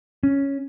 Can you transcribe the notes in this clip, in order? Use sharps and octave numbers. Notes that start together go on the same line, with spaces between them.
C#4